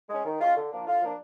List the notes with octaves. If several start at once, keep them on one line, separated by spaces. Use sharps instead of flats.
G#3 C#4
D#3
G#3 C#4 F4
D3
F3 A#3 D4
D3 F4
F3 A#3 D4